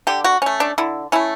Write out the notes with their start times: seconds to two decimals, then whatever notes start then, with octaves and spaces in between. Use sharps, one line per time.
0.07 D3 G4
0.24 F#4
0.42 A3 C#4
0.60 D4
0.78 D3 E4
1.12 A3 C#4 E4